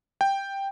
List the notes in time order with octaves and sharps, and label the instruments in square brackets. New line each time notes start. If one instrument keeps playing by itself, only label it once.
[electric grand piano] G5